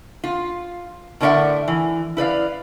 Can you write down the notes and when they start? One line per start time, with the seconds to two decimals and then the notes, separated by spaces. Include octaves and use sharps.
0.24 F4
1.21 A2 D3 A#4 D5 E5 F#5
1.68 E3
2.17 E4 B4 D5 F5